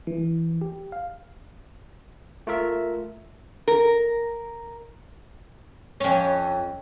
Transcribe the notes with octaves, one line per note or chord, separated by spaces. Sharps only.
E3
G4
F5
A3 F4 A#4 E5
A#4
F2 C#4